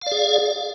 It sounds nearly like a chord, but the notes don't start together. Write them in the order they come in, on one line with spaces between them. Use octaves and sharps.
F5 D5 G#4